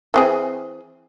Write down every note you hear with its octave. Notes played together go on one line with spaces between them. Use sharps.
E3 C4 G#4